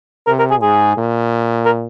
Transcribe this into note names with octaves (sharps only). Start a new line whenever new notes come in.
C3 A#4
A#4
G#4
G#2 G#4
A#2
A#4